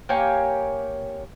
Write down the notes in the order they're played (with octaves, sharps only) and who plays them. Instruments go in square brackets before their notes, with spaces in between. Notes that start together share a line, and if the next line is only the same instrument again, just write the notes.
[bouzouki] A#3 G4 C#5 G#5